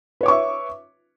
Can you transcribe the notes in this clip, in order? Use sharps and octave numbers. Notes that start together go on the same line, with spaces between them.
B4 C#5 E5 C#6 D6